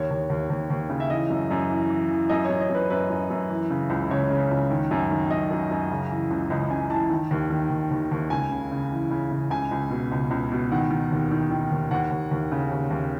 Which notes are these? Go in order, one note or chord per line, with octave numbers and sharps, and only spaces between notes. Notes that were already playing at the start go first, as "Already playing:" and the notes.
Already playing: D#2 C#5
D#2
D#2
D#2
D#2
C#3
E5
E3 D#5
F#2
F#2
E3
E3
E3
F#2 D#5
C#5
F#2
D#5
F#2 B4
F#2 B4
F#2
F#2
E3
C#3
C#2
C#2 C#5
C#3
C#2
D#3
F#2
D#3
F#2 D#5
F#2
F#2
C#3
E3
C#2
C#2 D#5
C#2 G#5
E3 A5
D#3
D#2
D#3
D#2
D#2
D#2
C#2 G#5
C#3
C#3
E3
C#3
C#3
C#2 G#5
C#2
B2
C#2
C#2
B2
D#3 F#5
D#3
D#2
D#3
D#3
D#2
D#2 F#5
D#2
D#2
C#3
D#2
D#2